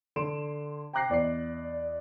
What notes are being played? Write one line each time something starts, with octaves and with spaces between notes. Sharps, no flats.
D3 C6 D7 E7
G5 A#5 D6 F#6 A#6 C7
E2 D5 D#5 C7